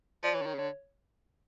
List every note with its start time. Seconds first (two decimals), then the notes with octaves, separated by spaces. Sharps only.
0.23 F3 D5
0.34 E3 C#5
0.42 D3
0.46 D#3 C#5
0.54 C#3
0.58 D3 C#5